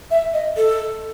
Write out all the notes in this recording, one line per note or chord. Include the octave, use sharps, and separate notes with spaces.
E5
D#5
A4